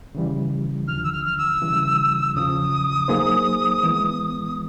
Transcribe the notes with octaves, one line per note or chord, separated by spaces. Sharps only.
C#3 E3 G3
D#2 D3 F3 F6
E6
F6
F6
E6
C#3 E3 G3
E2 C#3 F3 D#6
F#3 A#3 D#4 G#4 C5
E3 G#3 B3